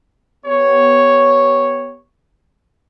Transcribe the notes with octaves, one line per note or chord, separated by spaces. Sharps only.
B3 G4 C#5